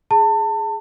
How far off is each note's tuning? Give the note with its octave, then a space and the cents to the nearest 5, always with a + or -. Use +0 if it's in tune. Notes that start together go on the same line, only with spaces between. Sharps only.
G#4 +5 A5 +30